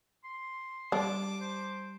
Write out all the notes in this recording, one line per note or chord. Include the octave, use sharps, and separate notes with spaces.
C6
G3 D4 A5 D6
C5